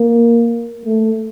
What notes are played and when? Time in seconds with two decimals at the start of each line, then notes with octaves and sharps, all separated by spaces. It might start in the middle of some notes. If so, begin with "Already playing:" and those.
Already playing: A#3
0.85 A3